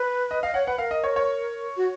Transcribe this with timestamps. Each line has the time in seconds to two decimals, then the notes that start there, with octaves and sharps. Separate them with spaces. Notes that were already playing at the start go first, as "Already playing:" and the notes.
Already playing: B4
0.31 D#5
0.42 D#5 F5
0.54 C#5 F#5
0.66 B4 F#5
0.78 A#4 F5
0.91 D#5
1.04 C#5
1.16 C#5
1.77 F#4